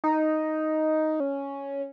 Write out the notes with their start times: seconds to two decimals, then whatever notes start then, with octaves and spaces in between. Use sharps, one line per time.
0.04 D#4
1.20 C#4